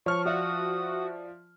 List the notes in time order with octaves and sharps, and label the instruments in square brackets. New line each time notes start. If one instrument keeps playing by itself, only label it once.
[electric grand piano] F3 F6 [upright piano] C#5 A5 [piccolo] C#6
[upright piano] F4 D5 E5 [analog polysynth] F#4 [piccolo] D#6